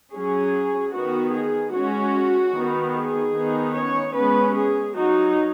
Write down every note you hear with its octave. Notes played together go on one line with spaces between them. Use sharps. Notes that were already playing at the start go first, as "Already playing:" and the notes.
F#3 C#4 G#4
D#3 B3 D#4 F#4
G#4
G#3 C#4 F#4
D#3 B3 D#4
G#4
D#3 B3 D#4
C#4 C#5
G#3 B3 C#4 B4
G#4
F#3 D#4 F#4